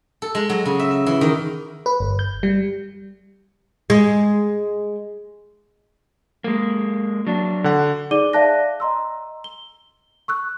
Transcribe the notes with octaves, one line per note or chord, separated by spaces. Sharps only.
A4
G#3
F#3
C#3
E5
E5
E3
D#3
B4
G1
G6
G3
G#3
G#3 A#3
F#3 D4
D3 F#5
D#4 G#4 D5 D6 D#7 G7
D5 E5 F5 A5 F#6 A#6
D#5 A#5 C6 E6
G7
C#6 E6 F#6